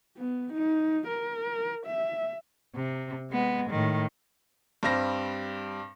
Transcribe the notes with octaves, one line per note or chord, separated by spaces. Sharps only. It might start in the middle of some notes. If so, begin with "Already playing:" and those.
B3
D#4
A#4
E5
C3
G#3 B3
A2 D#3
G2 G3 C4 A#6